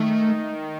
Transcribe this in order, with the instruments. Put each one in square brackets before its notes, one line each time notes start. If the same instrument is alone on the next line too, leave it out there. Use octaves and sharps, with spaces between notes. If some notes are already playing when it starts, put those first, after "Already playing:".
Already playing: [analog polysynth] D#3 [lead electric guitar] A3